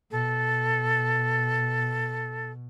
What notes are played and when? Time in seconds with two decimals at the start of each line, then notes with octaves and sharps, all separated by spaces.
0.11 B2 A4